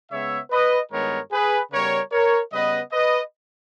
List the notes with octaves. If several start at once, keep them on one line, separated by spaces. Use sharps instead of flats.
C#3 G#3 B3 C#5 E5
B4 D#5
G2 D#3 G#3 B3 A#4 C#5
G#4 B4
C#3 G3 B3 A#4 C#5
A#4 C#5
C#3 G3 B3 B4 D#5
B4 D#5